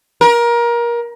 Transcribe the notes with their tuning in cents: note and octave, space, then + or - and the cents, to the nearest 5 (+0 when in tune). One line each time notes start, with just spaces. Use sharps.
A#4 +25